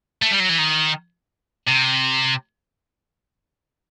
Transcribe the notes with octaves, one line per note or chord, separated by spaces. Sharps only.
A3
G3
F#3
E3
D#3
C3